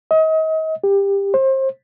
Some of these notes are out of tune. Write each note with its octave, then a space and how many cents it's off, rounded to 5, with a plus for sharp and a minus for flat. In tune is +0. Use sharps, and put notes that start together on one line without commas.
D#5 +35
G4 +20
C5 +30